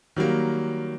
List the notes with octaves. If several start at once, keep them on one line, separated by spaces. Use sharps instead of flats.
D#3 F#3 G3 A#3